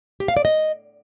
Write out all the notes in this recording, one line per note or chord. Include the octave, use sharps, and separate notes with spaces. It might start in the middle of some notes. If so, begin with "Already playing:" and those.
G4
F5
D5
D#5